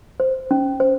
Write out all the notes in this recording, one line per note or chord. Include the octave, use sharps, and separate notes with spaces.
C5
C#4
C5